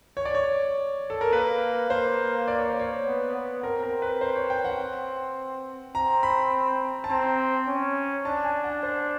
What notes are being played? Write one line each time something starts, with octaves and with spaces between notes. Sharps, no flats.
C#5
D5
C#5
A4
A#4
A#3 B4
A#3 C5
D5
C#5
C5
C#5
B3
B3
C4 A#4
A#4
B4
C5
C#5
G5
F#5
C4
C4 A#5
B5
A5
C4 A#5
C#4
D4 A5
G#5
F#5
C5